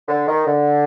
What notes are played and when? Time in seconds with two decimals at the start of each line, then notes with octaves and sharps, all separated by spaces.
0.08 D3
0.28 D#3
0.47 D3